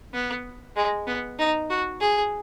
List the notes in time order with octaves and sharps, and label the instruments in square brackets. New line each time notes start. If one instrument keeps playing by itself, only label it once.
[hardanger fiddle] B3
G#3
B3
D#4
F#4
G#4